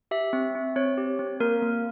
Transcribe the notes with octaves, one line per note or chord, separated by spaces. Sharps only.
G4 E5
C4
C4
C4 C#5
G4
C4
A#3 A#4
A#3